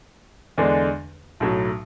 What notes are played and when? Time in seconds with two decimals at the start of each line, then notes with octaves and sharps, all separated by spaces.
0.58 E2 D3 G#3 D4
1.40 B1 A2 F#3